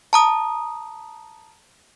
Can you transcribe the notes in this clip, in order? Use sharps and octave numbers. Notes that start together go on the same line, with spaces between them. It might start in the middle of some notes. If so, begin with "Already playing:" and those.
A5 A#5 D#6